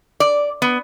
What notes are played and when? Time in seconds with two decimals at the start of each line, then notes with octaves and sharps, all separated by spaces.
0.20 D5
0.62 B3